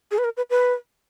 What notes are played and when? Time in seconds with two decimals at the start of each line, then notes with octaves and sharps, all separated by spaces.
0.11 G#4
0.18 B4
0.24 A#4
0.37 B4
0.50 B4